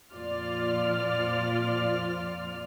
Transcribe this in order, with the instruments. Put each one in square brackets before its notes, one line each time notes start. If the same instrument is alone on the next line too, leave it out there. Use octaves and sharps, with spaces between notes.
[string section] F2 A#2 F3 F4 D5 F6